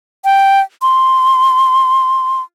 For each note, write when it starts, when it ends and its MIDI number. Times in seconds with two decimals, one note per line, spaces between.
0.25 0.60 79
0.82 2.41 84